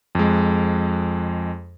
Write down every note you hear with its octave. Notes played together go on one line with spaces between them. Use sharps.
F2 G#3